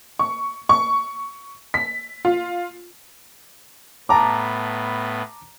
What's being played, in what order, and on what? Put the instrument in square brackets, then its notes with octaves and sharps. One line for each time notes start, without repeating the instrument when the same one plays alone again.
[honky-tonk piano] C#6
C#6
B6
F4
[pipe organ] A2 B3 [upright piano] A5 A#5 D6